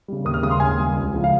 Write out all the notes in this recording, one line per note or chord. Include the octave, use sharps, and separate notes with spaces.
C#3 G3
D#2 D#6
F6
C#3 G3 D#6
C6
D#2 G#5
C#3 G3
C#2
C#3 F3
F5